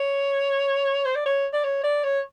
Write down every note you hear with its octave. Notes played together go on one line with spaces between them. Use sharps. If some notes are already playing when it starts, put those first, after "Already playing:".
Already playing: C#5
C5
D5
C#5
D5
C#5
D5
C#5